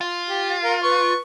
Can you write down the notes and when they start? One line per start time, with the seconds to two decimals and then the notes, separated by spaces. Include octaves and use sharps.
0.01 F4
0.28 G4
0.63 A#4 F5
0.83 B4 C#6